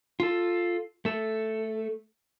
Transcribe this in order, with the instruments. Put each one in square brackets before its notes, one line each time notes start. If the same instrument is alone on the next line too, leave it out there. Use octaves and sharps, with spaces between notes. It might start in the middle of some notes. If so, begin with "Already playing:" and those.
[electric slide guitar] F4 A4
A3 A4